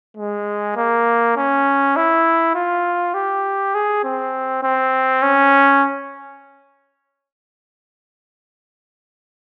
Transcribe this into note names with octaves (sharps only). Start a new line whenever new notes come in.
G#3
A#3
C#4
E4
F4
G4
G#4
C4
C4
C#4